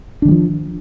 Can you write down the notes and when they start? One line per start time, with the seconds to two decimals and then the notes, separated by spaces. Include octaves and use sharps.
0.22 D4
0.25 D#3
0.28 G3
0.31 F3